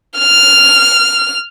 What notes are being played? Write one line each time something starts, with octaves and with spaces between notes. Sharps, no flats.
F6